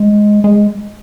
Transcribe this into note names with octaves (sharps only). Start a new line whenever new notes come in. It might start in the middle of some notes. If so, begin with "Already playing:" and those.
Already playing: G#3
G#3